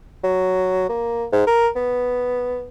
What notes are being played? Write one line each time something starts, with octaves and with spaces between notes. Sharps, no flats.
F#3
A#3
G#2
A#4
B3